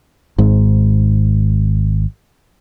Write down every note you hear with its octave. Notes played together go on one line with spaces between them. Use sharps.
G#1 G#2